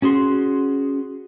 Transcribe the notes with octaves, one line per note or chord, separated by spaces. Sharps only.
C#4 F#4 G#4 C6